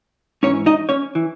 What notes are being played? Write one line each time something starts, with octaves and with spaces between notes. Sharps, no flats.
G#2 E3 C#4 C#5
D#4 D#5
C#4 C#5
E3